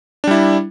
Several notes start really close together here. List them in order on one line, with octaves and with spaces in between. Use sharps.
D4 G3 E4